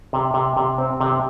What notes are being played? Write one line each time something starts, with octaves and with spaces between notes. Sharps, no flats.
C3
C3
C3
C4
C3